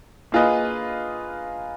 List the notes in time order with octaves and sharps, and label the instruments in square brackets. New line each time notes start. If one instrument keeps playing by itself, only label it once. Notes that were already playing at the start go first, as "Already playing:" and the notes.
[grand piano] A#3 F4 G#4 B4 D#5